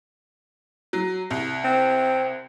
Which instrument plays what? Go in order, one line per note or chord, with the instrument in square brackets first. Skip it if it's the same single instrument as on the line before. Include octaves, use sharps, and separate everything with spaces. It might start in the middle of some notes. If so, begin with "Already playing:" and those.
[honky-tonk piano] F#3
C2
[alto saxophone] C4